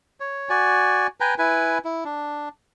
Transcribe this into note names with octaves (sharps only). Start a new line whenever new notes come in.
C#5
F#4 D5 G#5
B4 G5 G#5 A#5
E4 B4 G#5
E4
D4